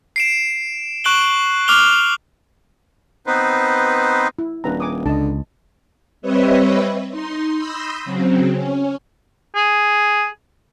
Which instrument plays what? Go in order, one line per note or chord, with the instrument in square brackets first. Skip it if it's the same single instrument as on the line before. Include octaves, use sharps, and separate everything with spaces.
[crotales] C7 D7 E7
C#6 F#6 D7 F#7 G7
D6 F6 F7 G7
[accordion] B3 C4 D#4 B4 C5
[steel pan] E4
[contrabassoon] D#1 [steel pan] D4 B4 A#5
[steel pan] G#5 D6 D#6
[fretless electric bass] C#2 [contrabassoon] D3 [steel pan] D#5 A5
[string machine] G3 C4 B4 C#5 D#5 E5
D#4 C6
B5 C6 D#6 E6 G6 A#6
C#3 F#3 C4
C#4
[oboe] G#4